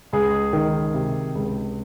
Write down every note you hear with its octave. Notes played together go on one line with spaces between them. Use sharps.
C#2 G#4
D#3
C3
C#2